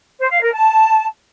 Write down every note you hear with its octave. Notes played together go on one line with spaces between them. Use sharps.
C5
F5
A#4
A5